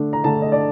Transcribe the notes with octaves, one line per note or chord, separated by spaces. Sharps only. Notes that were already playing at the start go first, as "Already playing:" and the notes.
Already playing: D3 A3 D4
A#5
D3 A3 D4 A5
D#5
D5